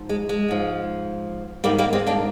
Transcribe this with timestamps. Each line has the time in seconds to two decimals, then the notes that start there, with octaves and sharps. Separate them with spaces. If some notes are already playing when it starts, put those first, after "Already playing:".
Already playing: G#2 F3
0.09 G#3
0.29 G#3
0.48 G#2 F3
1.64 G#2 D#3 G3 A#3
1.78 G3 A#3
1.93 G#3 C4
2.07 A#3 D4